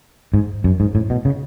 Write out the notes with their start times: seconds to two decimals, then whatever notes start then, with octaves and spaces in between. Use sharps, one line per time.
0.34 G#2
0.64 F#2
0.80 G#2
0.95 A2
1.10 B2
1.25 C#3